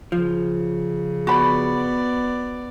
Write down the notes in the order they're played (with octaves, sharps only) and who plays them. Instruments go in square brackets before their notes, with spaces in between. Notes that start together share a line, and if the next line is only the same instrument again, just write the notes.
[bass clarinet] C#3 [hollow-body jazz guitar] F3
[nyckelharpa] B3 D5 [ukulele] F#4 B5